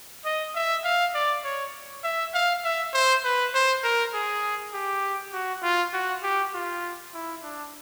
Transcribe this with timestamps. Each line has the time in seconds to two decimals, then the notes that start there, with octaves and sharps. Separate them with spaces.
0.25 D#5
0.55 E5
0.84 F5
1.14 D5
1.44 C#5
2.03 E5
2.34 F5
2.64 E5
2.93 C5
3.24 B4
3.54 C5
3.83 A#4
4.13 G#4
4.73 G4
5.33 F#4
5.63 F4
5.93 F#4
6.23 G4
6.53 F4
7.14 E4
7.43 D4